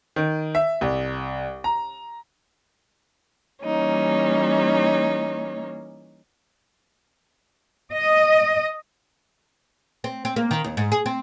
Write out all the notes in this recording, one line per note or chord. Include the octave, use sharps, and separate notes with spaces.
D#3
E5
C2
A#5
E3 G3 A#3 C#4 D#4 C#5
D#5
C4
C4
A#3
D#3
D#2
G#2
G#4
C4